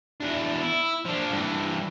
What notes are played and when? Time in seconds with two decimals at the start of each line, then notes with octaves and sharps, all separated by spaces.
0.20 E2 D4
0.61 E4
1.05 F3 D4
1.32 G2 E3